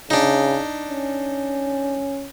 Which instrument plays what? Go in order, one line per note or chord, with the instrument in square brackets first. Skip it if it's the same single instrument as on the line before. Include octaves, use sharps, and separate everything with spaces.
[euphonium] C#3 [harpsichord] D4 D#4
[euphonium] C#4